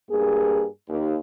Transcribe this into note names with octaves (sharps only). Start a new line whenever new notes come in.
G2 A#3 G#4
D#2